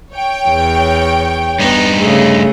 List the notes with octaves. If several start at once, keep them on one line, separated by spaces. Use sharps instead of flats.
C#5 G5
E2
G2 B3 D#4
C#3 A3 G#4